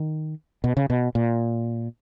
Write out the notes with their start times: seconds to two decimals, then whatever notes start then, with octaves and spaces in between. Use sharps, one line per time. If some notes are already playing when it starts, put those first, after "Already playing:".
Already playing: D#3
0.64 B2
0.77 C#3
0.90 B2
1.15 A#2